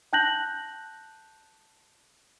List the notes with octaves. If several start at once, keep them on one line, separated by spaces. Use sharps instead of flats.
G5 A5 F#6 G6 A#6 F#7